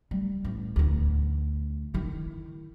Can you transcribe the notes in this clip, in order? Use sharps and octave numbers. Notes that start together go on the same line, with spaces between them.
G3
A1
D2 B3
D#3 E4